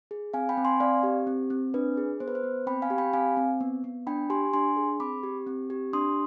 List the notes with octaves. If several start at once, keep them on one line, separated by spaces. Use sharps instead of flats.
G#4
C4 F5 G#5
G5 B5
C4
G#5 C6
C4 D5 F5
G4
C4
C4
D4 B4
G#4
B3 C5
B4
C5
B3
C4 G5 B5
F5 G#5
G4
G5 B5
C4 F5 G#5
C4
B3
B3
D4 G5 B5
G4 G#5 C6
D4 G#5 C6
G#4
C4 B5 D6
G4
C4
G4
D4 C6 D#6